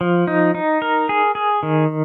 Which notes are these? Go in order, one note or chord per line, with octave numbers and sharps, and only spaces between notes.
F3
D#4
D#4
A#4
G#4
G#4
D#3